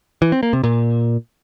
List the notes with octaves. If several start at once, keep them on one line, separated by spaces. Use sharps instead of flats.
E3
C4
A#3
C3
A#2